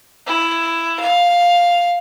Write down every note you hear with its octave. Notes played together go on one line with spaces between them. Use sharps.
E4
F5